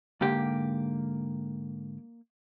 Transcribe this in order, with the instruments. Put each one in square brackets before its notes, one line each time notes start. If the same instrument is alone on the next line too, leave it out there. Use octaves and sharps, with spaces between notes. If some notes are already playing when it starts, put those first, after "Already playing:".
[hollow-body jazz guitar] G#2 D3 G4 [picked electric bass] A#3